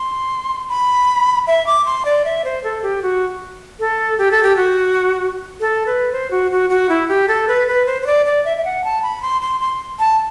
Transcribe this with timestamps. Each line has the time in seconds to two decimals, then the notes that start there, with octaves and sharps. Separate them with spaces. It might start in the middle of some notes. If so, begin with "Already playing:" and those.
Already playing: C6
0.69 B5
1.47 E5
1.67 D6
1.86 C6
2.05 D5
2.25 E5
2.45 C5
2.64 A4
2.83 G4
3.02 F#4
3.80 A4
4.18 G4
4.31 A4
4.43 G4
4.57 F#4
5.60 A4
5.87 B4
6.12 C5
6.31 F#4
6.51 F#4
6.70 F#4
6.89 E4
7.09 G4
7.28 A4
7.48 B4
7.68 B4
7.86 C5
8.02 C5
8.06 D5
8.26 D5
8.45 E5
8.57 E5
8.65 F#5
8.84 A5
9.02 B5
9.22 C6
9.42 C6
9.61 C6
9.99 A5